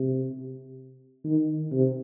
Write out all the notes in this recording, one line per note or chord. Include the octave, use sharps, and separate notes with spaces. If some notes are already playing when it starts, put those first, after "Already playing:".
Already playing: C3
D#3
C3